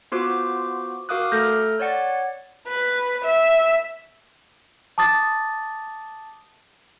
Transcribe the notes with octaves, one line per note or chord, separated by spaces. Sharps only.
B3 F4 F#4 C5 D6 F#6
F#4 A#4 F5 D6 D#6 F#6
A3 A4 F6 G6 A#6
C#5 D5 F#5 A6
B4
E5
A5 D6 D#6 A6